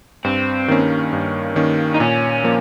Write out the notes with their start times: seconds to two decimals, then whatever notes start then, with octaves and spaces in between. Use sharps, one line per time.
0.24 G2 C4
0.68 D#3 A#3 C#4
1.13 G2
1.55 D#3 A#3 C#4
1.94 D#4
2.00 A#2 C#4
2.44 F3 A#3